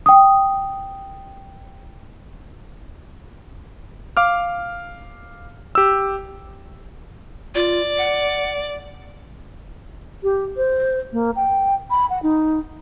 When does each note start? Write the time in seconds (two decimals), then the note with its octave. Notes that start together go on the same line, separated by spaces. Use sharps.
0.06 G5 D#6
4.17 F5 D6 F6
5.75 G4 E6
7.55 F4 D5
7.98 F#5
10.23 G4
10.57 C5
11.13 A#3
11.36 G5
11.90 B5
12.10 F#5
12.23 D#4